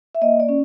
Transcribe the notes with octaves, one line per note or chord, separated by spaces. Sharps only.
E5
A#3 D#5
D5
C#4